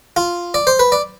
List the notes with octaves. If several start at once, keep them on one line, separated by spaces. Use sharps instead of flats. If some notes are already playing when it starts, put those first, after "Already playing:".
F4
D5
C5
B4
D5